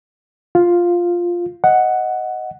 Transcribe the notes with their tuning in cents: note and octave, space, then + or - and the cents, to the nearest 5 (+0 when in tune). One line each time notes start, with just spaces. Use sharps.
F4 +0 F5 +5
D#5 +5 F#5 +0